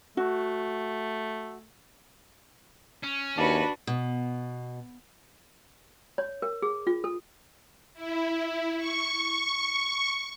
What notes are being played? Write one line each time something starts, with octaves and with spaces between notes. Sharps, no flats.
A3 F#4
C#4
D#2 D4 F#4 B4
B2
C#5
A#4
G#4
F4
A4
E4
C#6